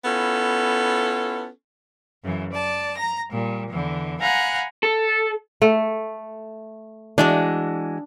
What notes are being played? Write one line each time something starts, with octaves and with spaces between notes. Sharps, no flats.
B3 C#4 E4 F4 A4
F#2 C#3 E3
D5 A5
A#5 A#6
A#2 G3
E2 D3 E3
F5 F#5 G#5 A#5 B5 F#6
A4
A3
E3 G#3 D4 F#4